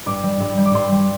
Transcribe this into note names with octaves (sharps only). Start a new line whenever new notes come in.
G2 D6
G3
G2
G3
D6
G2 C6
G3